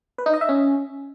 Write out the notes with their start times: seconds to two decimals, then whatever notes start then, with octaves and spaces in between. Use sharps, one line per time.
0.18 B4
0.26 D#4
0.34 D#5
0.41 E5
0.49 C#4